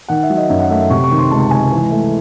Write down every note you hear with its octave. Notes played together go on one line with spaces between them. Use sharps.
D#3 F#5
E5
F#3
D#5
F#2 E5
F#5
A3 E5
E5
C3 C#6
C#6
D#3
C6
C#2 A5
G#3 G#5
E3
A3